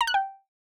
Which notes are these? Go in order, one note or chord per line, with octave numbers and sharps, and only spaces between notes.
A#5
F#6
G5